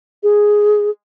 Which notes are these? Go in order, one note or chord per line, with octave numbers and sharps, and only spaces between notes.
G#4